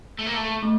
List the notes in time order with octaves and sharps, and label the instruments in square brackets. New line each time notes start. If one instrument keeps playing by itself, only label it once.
[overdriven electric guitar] A3
A#3
A3
[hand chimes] A3